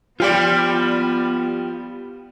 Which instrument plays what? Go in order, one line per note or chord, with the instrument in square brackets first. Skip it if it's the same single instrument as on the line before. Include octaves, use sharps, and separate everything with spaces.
[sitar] F3 G3 [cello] B3 [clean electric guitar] F4 G4 D5